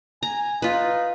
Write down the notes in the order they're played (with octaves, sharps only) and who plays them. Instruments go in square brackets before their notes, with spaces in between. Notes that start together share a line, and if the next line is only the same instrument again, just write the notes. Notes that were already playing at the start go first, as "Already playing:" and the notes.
[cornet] G#5 [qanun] A#5
[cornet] D#4 [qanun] F4 B4